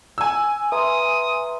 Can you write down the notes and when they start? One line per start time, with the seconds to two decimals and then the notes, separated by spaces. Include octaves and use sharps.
0.18 G#5 E6
0.72 B4 E5 A#5 C6 D#6